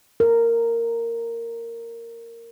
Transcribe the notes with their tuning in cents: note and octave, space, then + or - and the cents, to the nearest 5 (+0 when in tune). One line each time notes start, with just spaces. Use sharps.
A#4 -10